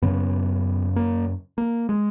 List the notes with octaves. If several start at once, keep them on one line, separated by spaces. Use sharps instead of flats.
F#2 C#3 B3
A#3
A#3
G#3